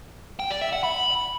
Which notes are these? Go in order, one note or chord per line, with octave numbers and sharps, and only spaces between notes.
G5
D5
E5
F#5
B5